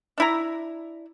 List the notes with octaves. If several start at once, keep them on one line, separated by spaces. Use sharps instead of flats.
D4 E4 A#5